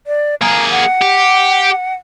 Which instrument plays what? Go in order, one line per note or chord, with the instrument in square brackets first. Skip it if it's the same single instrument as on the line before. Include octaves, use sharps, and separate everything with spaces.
[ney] D5
[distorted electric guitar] A#3 G#4 [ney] A#5
[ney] F#5
[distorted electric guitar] G4